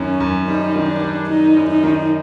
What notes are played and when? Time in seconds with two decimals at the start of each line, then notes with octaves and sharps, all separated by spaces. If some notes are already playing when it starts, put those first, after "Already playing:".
Already playing: F#2 D#3 C#4
0.20 F#2
0.48 G3 D#4
0.76 D#3
0.89 D4
1.02 G3
1.29 G3 D#4
1.57 F#2
1.70 D#4
1.84 D#3